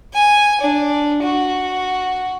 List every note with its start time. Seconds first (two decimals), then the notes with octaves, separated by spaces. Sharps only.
0.14 G#5
0.61 D4
1.23 F#4